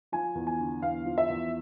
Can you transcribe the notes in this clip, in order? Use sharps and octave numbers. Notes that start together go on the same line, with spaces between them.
F3 G#5
E2
G#5
D3
E2 F5
F3
E5
E2